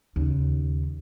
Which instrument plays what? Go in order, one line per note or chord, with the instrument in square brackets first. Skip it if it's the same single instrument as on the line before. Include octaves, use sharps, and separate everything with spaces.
[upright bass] D#2 C#3